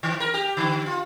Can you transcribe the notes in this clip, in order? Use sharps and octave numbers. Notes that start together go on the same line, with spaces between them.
D#3
A#4
G4
D3
F4